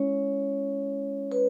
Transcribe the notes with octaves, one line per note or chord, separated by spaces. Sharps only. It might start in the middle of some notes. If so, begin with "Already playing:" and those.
Already playing: G#3 C#4 E4 C#5
B4